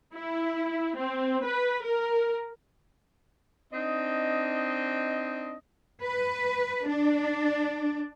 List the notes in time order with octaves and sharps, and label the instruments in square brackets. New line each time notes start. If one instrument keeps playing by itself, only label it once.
[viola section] E4
C4
B4
A#4
[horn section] C4 D4 D#4 D#5
[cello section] B4
D4